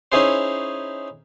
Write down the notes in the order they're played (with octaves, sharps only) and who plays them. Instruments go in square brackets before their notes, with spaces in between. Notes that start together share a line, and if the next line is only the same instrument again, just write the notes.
[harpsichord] C#4 D#4 E4 G#4 C5